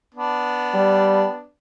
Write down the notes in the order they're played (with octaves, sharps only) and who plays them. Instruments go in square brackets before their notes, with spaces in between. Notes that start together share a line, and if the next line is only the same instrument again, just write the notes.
[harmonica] B3 D4
[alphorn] G3